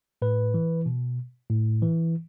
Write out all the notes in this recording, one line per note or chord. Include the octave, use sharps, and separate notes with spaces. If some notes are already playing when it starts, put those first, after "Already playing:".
A2 B4
E3
B2
A2
E3